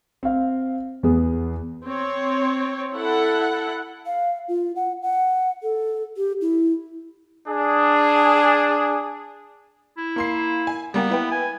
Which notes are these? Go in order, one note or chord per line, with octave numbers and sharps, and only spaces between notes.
C4 F5
E2 B3 G#4
C4 C#5
E4 A4 F#5
F5
F4
F#5
F#5
A4
G4
E4
D4 G#4
E4
A#3 C6 C7
G#5
G3 A#3 B3 G4
E4 B4 G5
G#5